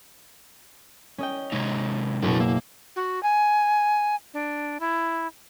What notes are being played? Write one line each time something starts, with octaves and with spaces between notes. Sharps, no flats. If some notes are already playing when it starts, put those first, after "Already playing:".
C#4 D#5 G5
C3 G#3 D#4
F#1 B2 D4 F#4
A#3 E5
F#4
G#5
D4
E4